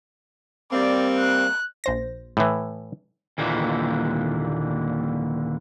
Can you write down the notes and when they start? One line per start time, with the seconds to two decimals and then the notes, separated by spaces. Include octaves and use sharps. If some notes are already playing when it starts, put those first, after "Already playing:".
0.73 G3 A#3 C4 D5
1.19 F#6
1.84 A#1 C5 A#6
2.37 A2 E3
3.38 D#2 A#2 D3 E3